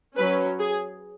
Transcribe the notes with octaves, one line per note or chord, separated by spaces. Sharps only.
F#3 C#4 B4
G#4